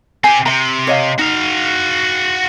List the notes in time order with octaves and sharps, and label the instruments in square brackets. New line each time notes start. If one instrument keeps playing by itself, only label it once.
[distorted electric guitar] C4 G4 [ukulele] G#5
[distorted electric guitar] C3 [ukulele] E5 A#5
[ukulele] C#5 D#5 F5
[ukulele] D#4 [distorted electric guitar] F#4 F5